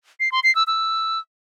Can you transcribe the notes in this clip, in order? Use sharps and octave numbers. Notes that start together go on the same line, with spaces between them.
C7
C6
C7
E6
E6